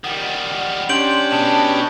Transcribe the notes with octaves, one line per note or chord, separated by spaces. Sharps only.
D#3 G3 F#5
C#4 D4 G4 C6 G6 D7 F#7
B2 A5